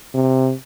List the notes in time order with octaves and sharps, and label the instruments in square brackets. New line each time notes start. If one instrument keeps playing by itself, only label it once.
[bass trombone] C3